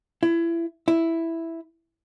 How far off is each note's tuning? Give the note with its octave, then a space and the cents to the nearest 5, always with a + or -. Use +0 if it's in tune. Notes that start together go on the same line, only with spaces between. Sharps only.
E4 +25
E4 +0